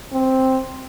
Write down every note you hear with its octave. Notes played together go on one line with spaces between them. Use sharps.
C4